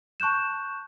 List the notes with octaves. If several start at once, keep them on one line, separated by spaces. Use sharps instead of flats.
A5 C#6 F#6 G6 E7